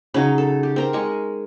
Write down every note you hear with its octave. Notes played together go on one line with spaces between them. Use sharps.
C#3 F#3 D#4
A4
G4
C4 A#4 A#5
G#3 C#6